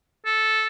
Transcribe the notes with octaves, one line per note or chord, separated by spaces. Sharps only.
A4